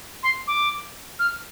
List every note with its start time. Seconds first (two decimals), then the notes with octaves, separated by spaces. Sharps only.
0.23 C6
0.48 D6
1.19 F6